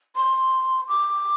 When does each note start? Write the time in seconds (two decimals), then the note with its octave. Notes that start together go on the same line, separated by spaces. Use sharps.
0.16 C6
0.88 D6